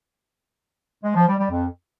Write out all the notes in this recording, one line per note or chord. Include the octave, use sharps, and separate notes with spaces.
G#3
F3
G3
G3
F2